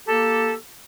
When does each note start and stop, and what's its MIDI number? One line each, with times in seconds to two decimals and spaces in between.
0.08 0.55 58
0.08 0.55 67
0.08 0.55 69